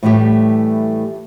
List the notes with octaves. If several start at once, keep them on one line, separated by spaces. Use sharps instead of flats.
A2 E3 G3 A3 G4